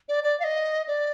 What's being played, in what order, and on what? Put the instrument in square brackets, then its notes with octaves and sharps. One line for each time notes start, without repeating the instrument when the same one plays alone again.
[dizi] D5
D5
F5
D#5
D5